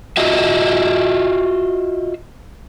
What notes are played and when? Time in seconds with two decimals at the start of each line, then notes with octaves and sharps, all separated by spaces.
0.17 F4 F#4 D#5 E5